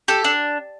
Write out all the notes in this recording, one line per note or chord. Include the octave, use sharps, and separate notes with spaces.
G4 A4
D4